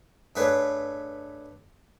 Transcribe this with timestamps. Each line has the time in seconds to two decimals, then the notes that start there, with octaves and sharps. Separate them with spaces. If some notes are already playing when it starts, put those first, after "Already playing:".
0.36 G2 A3 G#4 B4 C#5 D#6